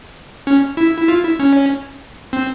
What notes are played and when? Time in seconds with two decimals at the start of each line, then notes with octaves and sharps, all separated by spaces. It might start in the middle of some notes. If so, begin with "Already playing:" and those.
0.47 C#4
0.77 E4
0.97 E4
1.08 F4
1.23 E4
1.39 C#4
2.33 C4